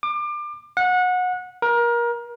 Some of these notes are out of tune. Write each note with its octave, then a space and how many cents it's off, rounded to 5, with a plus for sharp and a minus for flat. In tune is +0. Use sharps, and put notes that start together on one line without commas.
D6 +30
F#5 -25
A#4 +25